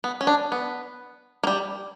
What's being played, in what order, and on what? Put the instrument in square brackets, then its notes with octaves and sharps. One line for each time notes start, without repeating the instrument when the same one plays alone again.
[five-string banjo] B3
C#4
D4
B3
A#3
G3